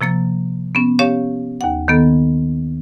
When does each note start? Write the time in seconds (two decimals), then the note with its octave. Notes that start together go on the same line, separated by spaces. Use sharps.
0.01 C3 F3 A#3 A6
0.75 B3 C#4
0.99 C#4 G4 C#5 F5
1.61 D#2 F#5
1.88 D#3 A#3 B3 A4